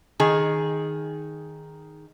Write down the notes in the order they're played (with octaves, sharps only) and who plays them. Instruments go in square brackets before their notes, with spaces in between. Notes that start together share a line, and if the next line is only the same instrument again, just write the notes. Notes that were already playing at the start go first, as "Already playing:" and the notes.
[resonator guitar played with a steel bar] D#3 G#4